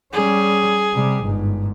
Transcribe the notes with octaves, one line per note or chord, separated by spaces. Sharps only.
G3 C#4 G#4
C3 G3
G1 G#2